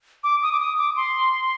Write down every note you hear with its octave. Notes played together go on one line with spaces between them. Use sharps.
D6
D#6
D6
D#6
D6
C6